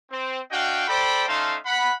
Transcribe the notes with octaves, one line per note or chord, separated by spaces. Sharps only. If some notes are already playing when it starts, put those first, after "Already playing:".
C4
D4 F#4 D#5 F5 G5
A4 C5 D5 G5 B5
A3 C#4 D#4 F5 A5 C6
F#5 B5